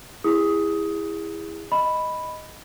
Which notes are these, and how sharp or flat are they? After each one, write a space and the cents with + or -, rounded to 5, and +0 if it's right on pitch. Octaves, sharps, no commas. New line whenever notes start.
E4 +0 G#4 -30 D#6 +15
D#5 +0 B5 +0